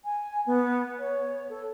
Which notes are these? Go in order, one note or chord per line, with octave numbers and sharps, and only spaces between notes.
G#5
B3
C#5
A4